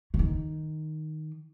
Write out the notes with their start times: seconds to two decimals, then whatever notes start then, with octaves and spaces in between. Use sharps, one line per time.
0.14 C#3
0.19 D#3